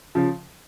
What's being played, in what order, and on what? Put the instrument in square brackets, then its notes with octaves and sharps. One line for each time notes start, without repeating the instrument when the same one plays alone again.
[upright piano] C#3 F3